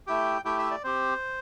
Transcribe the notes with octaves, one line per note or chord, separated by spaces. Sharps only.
A3 E4 G4 G5
A3 E4 G4 G5
E5
D5
C4 G4 C5